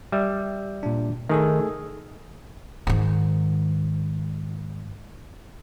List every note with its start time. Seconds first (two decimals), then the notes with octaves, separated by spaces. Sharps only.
0.12 G3 E5
0.83 A#2 D4
1.29 D#3 A3 G#4 A4
2.87 G#2 D#3